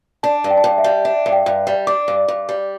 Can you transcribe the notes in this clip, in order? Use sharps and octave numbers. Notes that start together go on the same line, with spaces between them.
D4 A5
G2
G5
A5
G2 G5
D5
E5
G3
D4 E5
G2
G5
G2
G3
D4 D6
G2
G2
G3